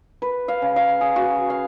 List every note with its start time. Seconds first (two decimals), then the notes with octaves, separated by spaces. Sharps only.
0.22 B4
0.48 F5
0.62 C#3
0.76 F5
1.01 G#4
1.16 F#4
1.50 F5